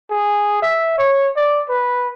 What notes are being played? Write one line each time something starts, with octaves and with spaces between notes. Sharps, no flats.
G#4
E5
C#5
D5
B4